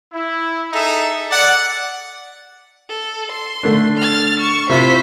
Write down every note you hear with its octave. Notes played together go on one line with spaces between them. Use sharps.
E4
D#4 G#4 A4 E5
D5 F#5
A4
C6
D3 A3 D4
F6 A6
C#6 E7
C3 E4 F4 C5 B6